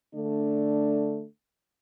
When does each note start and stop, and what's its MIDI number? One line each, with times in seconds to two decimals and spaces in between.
0.15 1.24 50
0.15 1.24 57
0.15 1.24 62